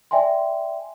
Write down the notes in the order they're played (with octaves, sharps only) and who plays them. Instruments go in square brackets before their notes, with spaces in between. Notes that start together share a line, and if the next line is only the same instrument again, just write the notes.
[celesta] D5 E5 G5 G#5 C6